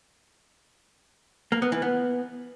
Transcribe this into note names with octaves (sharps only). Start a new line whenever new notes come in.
A#3
B3
E3
B3